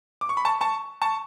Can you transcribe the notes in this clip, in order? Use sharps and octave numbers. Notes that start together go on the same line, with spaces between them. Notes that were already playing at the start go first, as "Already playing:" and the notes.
D6
C#6
B5
A5 C#6
A5 C#6
A5 C#6